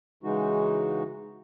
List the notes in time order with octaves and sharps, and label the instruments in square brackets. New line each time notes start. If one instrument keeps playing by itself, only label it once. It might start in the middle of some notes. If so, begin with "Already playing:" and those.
[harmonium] C#3 E3 G#3 D#4 F#4